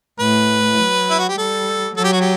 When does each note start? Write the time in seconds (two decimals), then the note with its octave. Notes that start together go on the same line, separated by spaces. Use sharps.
0.19 A2 B4
0.79 F#3
1.10 E4
1.19 F#4
1.29 G4
1.37 G3 A4
1.96 F#3 A4
2.04 G4
2.13 F#4
2.20 G4